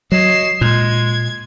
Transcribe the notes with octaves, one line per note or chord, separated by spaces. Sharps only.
F#3 C#5 D#5 C7 E7
A#2 G#3 G#6